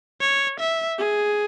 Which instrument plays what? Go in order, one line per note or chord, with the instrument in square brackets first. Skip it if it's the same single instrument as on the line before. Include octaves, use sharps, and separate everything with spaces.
[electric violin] C#5
E5
[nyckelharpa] G#4